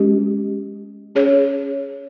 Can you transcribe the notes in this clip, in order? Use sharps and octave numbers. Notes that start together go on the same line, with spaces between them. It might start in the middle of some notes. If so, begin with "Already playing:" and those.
Already playing: G#3 C#4 G4
C#4 G#4 C#5